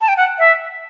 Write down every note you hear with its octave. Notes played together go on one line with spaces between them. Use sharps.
A5
G5
F#5
E5